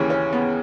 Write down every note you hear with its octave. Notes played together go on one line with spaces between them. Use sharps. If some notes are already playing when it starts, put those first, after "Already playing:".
Already playing: D#2 C#3 E3 C#4
C#4
B3